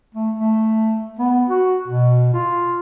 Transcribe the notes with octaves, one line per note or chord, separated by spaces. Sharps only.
A3
A3
B3
F#4
B2
F4